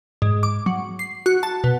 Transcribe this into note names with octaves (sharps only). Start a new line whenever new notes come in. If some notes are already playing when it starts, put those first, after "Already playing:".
G#2
D6
F#3
C7
F#4
A5
B2